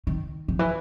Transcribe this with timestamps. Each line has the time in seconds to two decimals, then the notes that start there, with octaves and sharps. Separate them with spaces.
0.07 D#3
0.48 D#3
0.59 E3